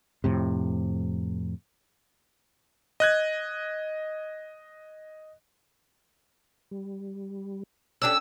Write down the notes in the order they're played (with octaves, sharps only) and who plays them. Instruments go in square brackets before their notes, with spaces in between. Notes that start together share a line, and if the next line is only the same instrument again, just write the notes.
[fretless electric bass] F2 A2 C3
[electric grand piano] D#5 F#6 G#6
[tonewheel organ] G3
[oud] C#4 D4 G4 [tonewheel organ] A4 D5 [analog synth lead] E6